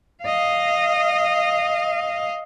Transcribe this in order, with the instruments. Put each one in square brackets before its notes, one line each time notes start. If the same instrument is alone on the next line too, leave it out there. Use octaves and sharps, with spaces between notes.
[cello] D#5 F5